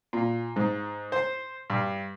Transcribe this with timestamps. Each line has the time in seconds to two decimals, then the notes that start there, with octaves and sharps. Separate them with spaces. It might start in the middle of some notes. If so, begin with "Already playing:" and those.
0.13 A#2
0.56 G#2
1.12 C5
1.70 G2